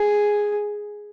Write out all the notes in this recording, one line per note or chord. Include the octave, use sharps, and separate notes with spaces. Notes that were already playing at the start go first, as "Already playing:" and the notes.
Already playing: G#4